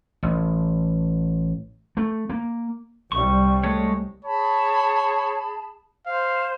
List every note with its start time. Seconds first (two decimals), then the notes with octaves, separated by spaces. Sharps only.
0.23 A1
1.97 A3
2.30 A#3
3.12 C2 G3 C#6
3.63 G#3 A3 C#5
4.25 G#4 C#5 A5 B5
6.06 C5 F5